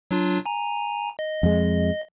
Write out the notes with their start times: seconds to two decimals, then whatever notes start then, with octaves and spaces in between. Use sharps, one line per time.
0.11 F#3 D4 F4
0.46 G#5 A#5
1.19 D#5
1.43 F2 G#3